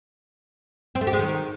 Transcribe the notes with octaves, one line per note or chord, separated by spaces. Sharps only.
C4
A3
G4
G#3
D#3